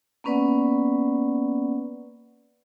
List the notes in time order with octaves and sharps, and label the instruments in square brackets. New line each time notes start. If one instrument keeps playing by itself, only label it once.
[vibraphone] A#3 B3 C#4 B4 D5 F#5